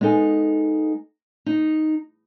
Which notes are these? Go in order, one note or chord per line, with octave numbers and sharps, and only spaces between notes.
G#3 B3 D#4 A4 G#5
D#4